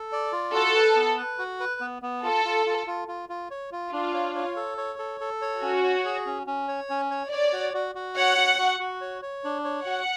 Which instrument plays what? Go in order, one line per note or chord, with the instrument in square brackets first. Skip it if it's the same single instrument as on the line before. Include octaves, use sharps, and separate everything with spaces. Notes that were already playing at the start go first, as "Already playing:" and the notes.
Already playing: [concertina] A4
D5
F4
[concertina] F#4 [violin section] A4
[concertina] B4
B3
B4
F#4
B4
B3
B3
[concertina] F4 [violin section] A4
[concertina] F4
F4
F4
F4
F4
C#5
F4
[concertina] D4 [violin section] F4
[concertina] C#5
C#5
A4
C#5
A4
A4
C#5
[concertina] C#4 [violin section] F#4
[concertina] C#5
G#4
C#4
C#4
C#5
C#4
C#5
[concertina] C#5 [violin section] D5
[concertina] F#4
F#4
F#4
[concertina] C#5 [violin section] F#5
[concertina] F#4
F#4
F#4
C#5
C#5
D4
C#5
[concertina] F#4 [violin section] F#5